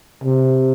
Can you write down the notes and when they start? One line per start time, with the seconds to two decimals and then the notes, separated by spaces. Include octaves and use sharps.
0.24 C3